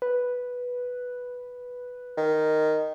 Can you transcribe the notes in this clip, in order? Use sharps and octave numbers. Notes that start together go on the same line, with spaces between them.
B4
D#3